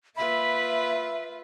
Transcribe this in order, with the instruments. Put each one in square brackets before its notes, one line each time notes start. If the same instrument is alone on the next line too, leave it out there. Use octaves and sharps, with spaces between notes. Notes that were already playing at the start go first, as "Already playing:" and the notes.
[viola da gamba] A#3 F4 B4 [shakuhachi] E5 [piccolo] B5